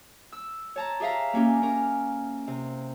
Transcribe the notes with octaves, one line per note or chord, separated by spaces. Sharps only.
E6
C#5 A5 A#5
G4 G#4 E5 F5 A#5
A#3 C#4 G4
C#4 A#4
C3